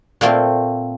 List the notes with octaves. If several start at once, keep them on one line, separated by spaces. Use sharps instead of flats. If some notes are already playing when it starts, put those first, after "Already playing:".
A#2 A3 A#3 C4